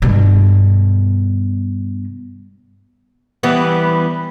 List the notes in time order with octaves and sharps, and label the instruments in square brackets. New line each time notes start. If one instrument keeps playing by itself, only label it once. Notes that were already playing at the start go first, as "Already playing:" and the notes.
[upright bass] G2 B2
[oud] E3 G3 B3